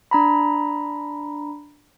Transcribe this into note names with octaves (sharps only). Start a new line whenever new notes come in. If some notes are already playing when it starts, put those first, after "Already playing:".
D4 A#5 B5